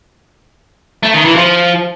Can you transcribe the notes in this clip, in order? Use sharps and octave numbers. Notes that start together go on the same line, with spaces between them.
A3
D#3
E3
F3